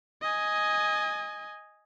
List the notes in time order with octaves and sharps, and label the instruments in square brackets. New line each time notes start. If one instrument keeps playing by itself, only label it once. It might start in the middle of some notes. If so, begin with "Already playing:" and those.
[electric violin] D#5 G#5